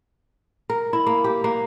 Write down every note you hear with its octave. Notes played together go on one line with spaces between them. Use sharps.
A#4
E4
A#3
G4
A#3